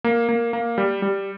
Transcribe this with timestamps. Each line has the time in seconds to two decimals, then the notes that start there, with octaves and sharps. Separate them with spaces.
0.04 A#3
0.29 A#3
0.53 A#3
0.78 G3
1.02 G3